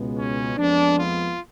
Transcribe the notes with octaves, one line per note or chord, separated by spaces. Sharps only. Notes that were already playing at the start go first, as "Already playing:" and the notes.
Already playing: C#2 B2 G#3 B3
C#4
F2 F3 G#3 B3 D4
F4